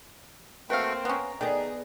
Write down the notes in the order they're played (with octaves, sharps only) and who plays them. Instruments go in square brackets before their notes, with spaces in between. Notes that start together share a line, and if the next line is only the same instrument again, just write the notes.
[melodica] A3 F#4 G5 [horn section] A#3 C4 [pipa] B4 F5
[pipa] B3 C#4 [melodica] A#5
[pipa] D#3 [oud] B3 A4 D5 [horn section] G#4